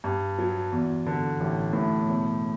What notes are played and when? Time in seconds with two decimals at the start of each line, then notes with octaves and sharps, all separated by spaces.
0.04 G2
0.39 F#3
0.72 E2
1.06 D3
1.40 A1
1.73 A2
2.08 E1